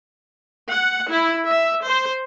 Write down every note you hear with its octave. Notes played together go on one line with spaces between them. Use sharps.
F#5
E4
E5
C5